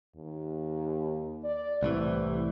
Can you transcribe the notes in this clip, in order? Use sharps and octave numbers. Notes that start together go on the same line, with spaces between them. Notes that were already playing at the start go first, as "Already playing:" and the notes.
D#2
D5
C2 A2 C3 E3